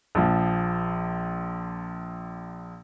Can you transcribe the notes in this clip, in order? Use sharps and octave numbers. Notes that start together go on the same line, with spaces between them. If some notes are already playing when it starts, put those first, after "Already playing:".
A#1 F3